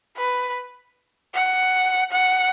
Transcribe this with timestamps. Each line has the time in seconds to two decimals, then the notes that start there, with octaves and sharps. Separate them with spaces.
0.17 B4
1.33 F#5
2.12 F#5